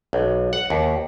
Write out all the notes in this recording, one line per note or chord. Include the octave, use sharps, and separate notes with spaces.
B1
F#5
D#2